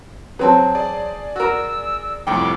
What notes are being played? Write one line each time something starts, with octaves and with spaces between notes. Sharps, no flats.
F#3 C4 G#4 B4 A5
G#4 D5
F#4 A#4 E6
C2 F2 A2 G5 D6